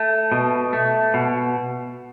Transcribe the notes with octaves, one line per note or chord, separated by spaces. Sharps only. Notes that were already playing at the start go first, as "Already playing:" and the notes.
Already playing: A3
B2
A3
B2